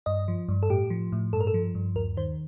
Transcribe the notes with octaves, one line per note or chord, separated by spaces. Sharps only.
G2 D#5
F3
G2
A4
A2 G4
F3
A2
G2 A4
A#4
A4
F3
G2
D#2 A#4
D#3 C5